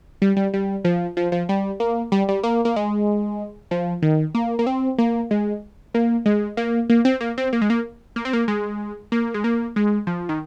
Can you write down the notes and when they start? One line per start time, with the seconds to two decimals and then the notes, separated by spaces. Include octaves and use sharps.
0.22 G3
0.36 G3
0.54 G3
0.85 F3
1.17 F3
1.32 F3
1.49 G3
1.80 A#3
2.12 G3
2.29 G3
2.43 A#3
2.65 A#3
2.76 G#3
3.71 F3
4.02 D#3
4.35 A#3
4.59 A#3
4.67 C4
4.98 A#3
5.31 G#3
5.94 A#3
6.26 G#3
6.57 A#3
6.90 A#3
7.05 C4
7.21 A#3
7.38 C4
7.53 A#3
7.62 G#3
7.70 A#3
8.16 A#3
8.25 C4
8.33 A#3
8.48 G#3
9.12 A#3
9.34 G#3
9.44 A#3
9.76 G#3
10.07 F3
10.29 D#3